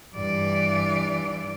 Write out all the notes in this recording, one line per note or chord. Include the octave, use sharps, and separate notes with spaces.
G2 E3 D5